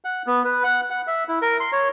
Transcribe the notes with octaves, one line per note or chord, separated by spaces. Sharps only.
F#5
B3
B4
F#5
F#5
E5
E4
A#4
C6
C#5